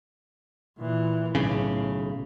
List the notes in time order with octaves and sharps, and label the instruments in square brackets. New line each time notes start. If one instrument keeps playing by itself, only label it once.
[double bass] A#2 E3
[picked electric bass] B1 C#3 [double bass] A2